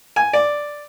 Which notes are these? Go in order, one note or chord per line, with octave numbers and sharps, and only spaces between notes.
G#5
D5